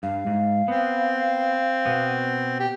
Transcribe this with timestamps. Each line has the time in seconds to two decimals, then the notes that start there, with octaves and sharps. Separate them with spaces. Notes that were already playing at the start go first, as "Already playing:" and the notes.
0.03 G2 F5
0.27 G#2
0.68 B3 C4
1.85 B2 B3
2.60 G4